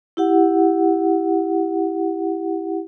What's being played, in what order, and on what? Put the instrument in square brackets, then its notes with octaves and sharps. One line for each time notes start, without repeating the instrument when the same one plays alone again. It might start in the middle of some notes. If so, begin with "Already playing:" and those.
[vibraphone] E4 G4 F#5